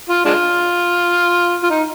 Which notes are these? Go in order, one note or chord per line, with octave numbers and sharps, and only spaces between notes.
F4
G#3 D4 F4
F4
D#4